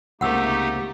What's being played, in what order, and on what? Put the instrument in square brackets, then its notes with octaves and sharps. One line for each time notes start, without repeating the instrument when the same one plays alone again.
[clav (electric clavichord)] C#2 C3 A#3 [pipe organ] A3 D#4 G4 [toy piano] F#5 E6